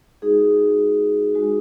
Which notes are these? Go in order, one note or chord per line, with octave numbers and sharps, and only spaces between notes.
G#3 D#4 F#4 G#4
G#3 D#4 F#4